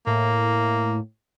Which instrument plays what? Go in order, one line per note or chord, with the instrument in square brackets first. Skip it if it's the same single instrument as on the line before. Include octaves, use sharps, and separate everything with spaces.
[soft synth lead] A2 [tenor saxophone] A#3